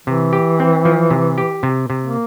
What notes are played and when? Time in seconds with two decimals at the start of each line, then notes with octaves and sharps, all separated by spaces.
0.07 C3 E3
0.33 G4
0.60 C4
0.85 F3
1.11 C3
1.38 G4
1.63 C3
1.90 C3
2.03 A#3